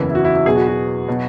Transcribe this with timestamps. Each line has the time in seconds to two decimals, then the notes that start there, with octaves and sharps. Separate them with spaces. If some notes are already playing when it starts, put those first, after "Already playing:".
Already playing: F#1 E2 C#3 E3 E4
0.10 E4
0.15 F#4
0.25 E4
0.36 E4
0.45 E2 B2 F#3 G#4
0.55 F#4
0.67 F#4
1.08 B2 F#3